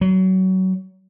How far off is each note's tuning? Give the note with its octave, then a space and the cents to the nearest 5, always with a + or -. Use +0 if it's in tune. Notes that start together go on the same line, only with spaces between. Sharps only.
F#3 +25